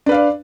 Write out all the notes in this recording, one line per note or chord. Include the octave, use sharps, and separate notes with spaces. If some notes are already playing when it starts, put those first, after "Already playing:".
D4 B4 D5 F5